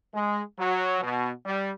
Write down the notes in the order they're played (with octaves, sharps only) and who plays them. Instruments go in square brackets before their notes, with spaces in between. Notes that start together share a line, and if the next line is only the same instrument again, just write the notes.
[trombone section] G#3
F#3
B2
G3